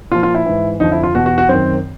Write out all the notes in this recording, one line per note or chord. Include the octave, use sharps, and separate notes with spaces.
A#2 F3 F4
F4
E4
G#2 E3
F2 D3 F3 D#4
E4
F4
E2 B2 F#4
F#4
F#4
F#2 D#3 C4